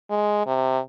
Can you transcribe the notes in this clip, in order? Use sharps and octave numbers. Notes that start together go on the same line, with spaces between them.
G#3
C3